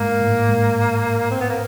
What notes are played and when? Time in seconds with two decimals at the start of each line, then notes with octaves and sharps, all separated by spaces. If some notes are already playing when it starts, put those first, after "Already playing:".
Already playing: G#2 A#3
0.21 A2
0.49 G#2
1.31 C4
1.41 B3
1.50 A#3